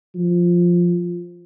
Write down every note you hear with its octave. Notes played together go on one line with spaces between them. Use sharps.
F3